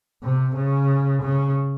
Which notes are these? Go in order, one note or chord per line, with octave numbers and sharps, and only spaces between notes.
C3
C#3
C#3